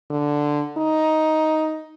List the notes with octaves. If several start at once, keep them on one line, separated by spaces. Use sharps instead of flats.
D3
D#4